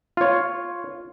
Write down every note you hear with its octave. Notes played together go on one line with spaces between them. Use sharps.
F4 C#5